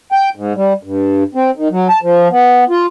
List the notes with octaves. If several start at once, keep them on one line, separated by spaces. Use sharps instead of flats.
G5
G#2
G3
G2
C4
D#3
F#3
A5
F3
B3
F4